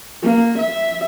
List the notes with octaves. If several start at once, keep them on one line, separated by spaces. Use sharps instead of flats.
A#3
E5